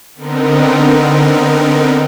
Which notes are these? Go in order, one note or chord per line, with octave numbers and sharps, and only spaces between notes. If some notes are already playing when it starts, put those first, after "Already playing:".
D3 B3 C4 D#4 A#4